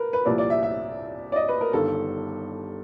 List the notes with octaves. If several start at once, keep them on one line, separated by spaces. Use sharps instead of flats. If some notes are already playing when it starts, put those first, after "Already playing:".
Already playing: A#4 B4
B4
C2 A#2 F3 D5
D5
E5
E5
D5
D#5
B4
A#4
G1 G2 D#3 A4